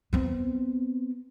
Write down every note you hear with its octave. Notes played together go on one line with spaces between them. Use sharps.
B3 C4